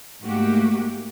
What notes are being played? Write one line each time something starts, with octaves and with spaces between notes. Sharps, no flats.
G#2 A3 A#3 F#4 G4